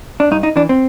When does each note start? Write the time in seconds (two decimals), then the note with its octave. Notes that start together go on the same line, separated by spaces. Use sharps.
0.20 D4
0.31 G2 D#4
0.43 D#4
0.56 E3 D4
0.69 C4